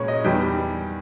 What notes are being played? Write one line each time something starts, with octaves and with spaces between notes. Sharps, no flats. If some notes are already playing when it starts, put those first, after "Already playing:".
Already playing: A#2 G#3 C#4 A#4 B4 C#5
D#5
E2 D#3 G3 B3 G5